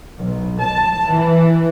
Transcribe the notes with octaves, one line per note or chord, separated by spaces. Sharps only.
B1
A5
E3